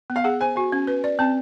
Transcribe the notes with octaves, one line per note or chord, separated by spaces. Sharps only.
B3
F5
G#4 F#5
C5 G#5
F#4 G#5
C#4
B4
D5
C4 A5